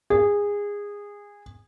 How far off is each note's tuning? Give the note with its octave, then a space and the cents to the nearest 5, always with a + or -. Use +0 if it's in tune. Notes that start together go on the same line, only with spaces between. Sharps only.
G#4 -20